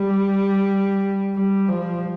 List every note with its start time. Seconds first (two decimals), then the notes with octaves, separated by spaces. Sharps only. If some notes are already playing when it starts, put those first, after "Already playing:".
Already playing: G3
1.35 G3
1.69 F3